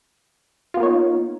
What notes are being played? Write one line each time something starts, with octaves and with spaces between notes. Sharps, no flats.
A#3 B3 D#4 F4 C#5